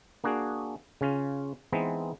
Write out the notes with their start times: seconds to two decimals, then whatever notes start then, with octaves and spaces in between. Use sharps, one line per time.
0.24 A#3 D4 F#4 G#4
1.01 C#3 C#4 F4
1.72 E3 G#3 B3 C4 D#4